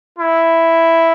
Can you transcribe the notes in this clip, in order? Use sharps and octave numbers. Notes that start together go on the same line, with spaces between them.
E4